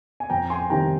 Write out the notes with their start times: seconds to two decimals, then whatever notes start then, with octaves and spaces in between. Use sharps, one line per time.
0.20 G#5
0.30 F2 G5 A#5
0.50 G#5 C6
0.70 C3 D#3 G3 G5 A#5